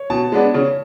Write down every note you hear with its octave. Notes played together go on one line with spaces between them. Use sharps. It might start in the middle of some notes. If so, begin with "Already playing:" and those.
Already playing: C#5
B2 A5
G#3 B3 D4
C#3